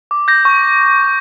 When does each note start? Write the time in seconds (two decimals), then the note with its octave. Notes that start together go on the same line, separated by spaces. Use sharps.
0.11 D6
0.28 G6 A#6
0.45 C#6